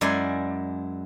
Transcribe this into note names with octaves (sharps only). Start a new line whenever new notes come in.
F#2 G#3 E4 D5 G#5